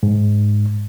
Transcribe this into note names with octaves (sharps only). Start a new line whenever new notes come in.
G#2